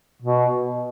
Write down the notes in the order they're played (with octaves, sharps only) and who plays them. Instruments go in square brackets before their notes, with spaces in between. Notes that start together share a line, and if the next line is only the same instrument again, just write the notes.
[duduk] B2